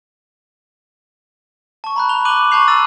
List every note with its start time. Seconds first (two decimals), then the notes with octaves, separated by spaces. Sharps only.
1.84 A5 C#6
1.96 A#5 B5 F#6
2.09 F7 G7
2.25 D6 F#6 D#7 F#7
2.51 A5 C#6 G6 C7 F7
2.67 A#5 E6 A6 D#7